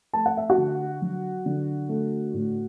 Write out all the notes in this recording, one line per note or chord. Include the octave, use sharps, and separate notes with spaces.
A3 A5
F#5
E5
F#4 F#5
D3
F#3
D3
A3
A2